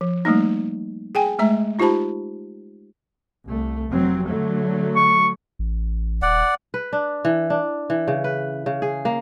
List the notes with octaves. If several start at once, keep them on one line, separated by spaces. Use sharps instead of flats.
F3
G3 A3 A#3 D#4
G#4 G5 G#5
G#3 A3 E5 A#5
D#4 F4 G4 C5 A5 B5
C2 A3
F1 F#3 C4
D3 F#3 A3
C#6
A1
D#1 D5 F#5
B4
D4
E3
D4
E3
C#3
B4
C#3
G#4
A#3